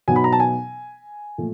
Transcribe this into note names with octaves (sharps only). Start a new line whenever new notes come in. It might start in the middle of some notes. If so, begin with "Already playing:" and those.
B2 F#3 B3 D#4 G#5
B5
A#5
A5
G#5
A#2 F3 A3